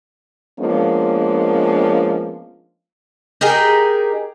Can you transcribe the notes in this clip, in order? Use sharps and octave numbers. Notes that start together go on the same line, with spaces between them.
F3 G#3 A#3 B3 C#4 D4
D#4 G4 G#4 A#4